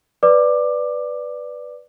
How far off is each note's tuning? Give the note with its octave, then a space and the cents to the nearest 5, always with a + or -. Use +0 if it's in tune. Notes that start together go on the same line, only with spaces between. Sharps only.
B4 +0 D5 +0 D6 +15